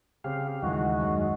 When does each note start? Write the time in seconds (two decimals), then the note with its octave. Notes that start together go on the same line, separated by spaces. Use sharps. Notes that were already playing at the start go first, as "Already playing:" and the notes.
0.24 C#3 C4 G4 F5
0.62 D#2 G#2 C#3 E3 D#4 F#4
1.01 F#2 G#3